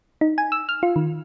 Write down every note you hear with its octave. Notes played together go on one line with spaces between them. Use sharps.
D#4
G#5
E6
F6
F4
D#3